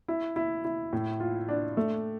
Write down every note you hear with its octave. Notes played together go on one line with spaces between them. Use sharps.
E4
E4
E4
A2
F4
D4
A3